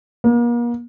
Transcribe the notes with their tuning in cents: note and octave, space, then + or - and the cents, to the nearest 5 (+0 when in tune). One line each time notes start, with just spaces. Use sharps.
A#3 +40